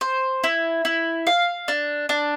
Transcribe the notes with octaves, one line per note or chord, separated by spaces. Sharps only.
C5
E4
E4
F5
D4
D4